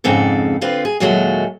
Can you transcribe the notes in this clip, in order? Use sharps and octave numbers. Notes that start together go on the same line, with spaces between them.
F2 G#2 C#3 C4 A4
D3 C4 F4 B4
G#4
D#2 A#2 F#3 G#3 A3 F#4